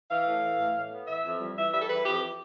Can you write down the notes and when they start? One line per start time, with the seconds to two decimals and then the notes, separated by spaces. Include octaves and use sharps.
0.10 E3 F5
0.26 A2
0.42 E3
0.59 A2
0.75 A2
0.91 B3
1.08 E3 E5
1.24 F2
1.40 G3
1.57 E3 E5
1.73 G3 E5
1.82 A4
1.89 E3 B4
2.06 F2 G4